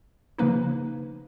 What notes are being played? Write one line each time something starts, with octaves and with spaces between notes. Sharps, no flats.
C#3 F3 A#3 D#4 B4